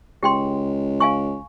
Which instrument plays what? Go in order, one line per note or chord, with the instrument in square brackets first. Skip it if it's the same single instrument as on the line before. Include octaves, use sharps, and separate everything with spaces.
[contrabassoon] C#2 [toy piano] G4 G5 C6
[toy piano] F5 G#5 C#6